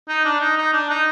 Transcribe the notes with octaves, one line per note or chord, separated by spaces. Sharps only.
D#4
D4
D#4
D#4
D4
D#4